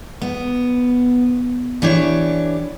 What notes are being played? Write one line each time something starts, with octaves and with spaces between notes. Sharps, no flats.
B3
E3 D4 G4 C#5